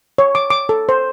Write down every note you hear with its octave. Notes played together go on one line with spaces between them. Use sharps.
C#5
D6
D6
A4
C5